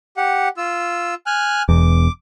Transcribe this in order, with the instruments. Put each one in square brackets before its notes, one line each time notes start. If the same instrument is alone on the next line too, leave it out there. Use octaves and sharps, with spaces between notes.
[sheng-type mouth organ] G4 F#5
F4 E6
G#5 F6 F#6
[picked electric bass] E1 E2 [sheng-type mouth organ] D6